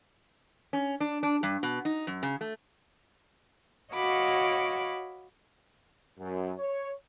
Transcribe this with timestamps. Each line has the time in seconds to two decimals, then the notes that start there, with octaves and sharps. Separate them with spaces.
0.73 C#4
1.00 D4
1.23 D4
1.43 G2
1.63 B2
1.85 D#4
2.07 F#2
2.23 C#3
2.41 A3
3.94 F#4 C#5 D#5 F5 B5 D6
6.19 F#2
6.59 C#5